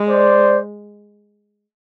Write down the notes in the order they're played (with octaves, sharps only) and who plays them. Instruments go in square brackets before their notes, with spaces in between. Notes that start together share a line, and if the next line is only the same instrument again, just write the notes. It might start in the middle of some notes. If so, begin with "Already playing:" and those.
Already playing: [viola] G#3
[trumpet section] C5 D5